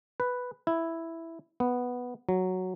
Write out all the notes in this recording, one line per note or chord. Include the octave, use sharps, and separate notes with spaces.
B4
E4
B3
F#3